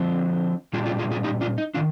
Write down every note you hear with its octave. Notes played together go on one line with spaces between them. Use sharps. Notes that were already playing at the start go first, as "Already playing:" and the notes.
Already playing: D3 F3 C4
A#2 G3 D4 F4 G#4
F4 G#4
F4 G#4
F4 G#4
D#4 G4
D4 F4
D#4
D#3 D4 F4